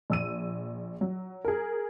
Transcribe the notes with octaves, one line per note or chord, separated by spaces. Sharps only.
A#1 E6 D#7
F#3
G#4 A#4